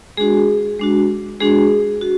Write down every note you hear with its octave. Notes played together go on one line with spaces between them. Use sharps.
G#3 D4 F#4 G#4
G#3 D4 F#4
G#3 D4 F#4 G#4
F#4